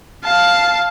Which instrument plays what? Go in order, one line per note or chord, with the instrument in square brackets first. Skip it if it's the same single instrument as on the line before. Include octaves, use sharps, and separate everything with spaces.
[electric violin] F5 A5